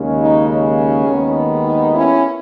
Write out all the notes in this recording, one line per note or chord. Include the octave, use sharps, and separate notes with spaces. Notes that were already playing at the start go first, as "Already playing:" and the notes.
Already playing: D#2 C#3 G#3 C#4
D#4
C#4
D#2 D#3 G#3 B3
D#4
C#4 E4